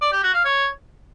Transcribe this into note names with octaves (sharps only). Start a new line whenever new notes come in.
D5
G4
F#4
F5
C#5